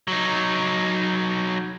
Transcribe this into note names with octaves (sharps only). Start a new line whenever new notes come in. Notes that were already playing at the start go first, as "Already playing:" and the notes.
F#3 D#4